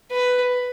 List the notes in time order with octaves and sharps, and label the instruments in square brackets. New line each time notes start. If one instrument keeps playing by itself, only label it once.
[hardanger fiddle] B4